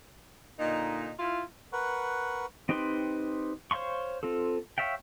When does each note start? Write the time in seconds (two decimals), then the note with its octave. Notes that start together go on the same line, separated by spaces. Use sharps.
0.59 A#2 D3 D#4
1.19 E4 F4
1.73 A#4 B4 F#5 C#6
2.69 C4 D#4 G4 B4 C6
3.71 C5 C#5 F5 C6 C#6
4.23 C4 F4 A4
4.78 C#5 E5 F5 G5